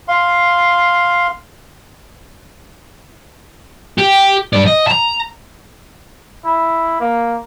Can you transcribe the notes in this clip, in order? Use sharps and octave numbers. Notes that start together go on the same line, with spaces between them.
F5 C6
G4
G2 D5
D#5
A5 A#5
E4
A#3